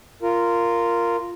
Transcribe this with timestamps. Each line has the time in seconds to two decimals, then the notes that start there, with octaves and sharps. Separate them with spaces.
0.22 F4 A#4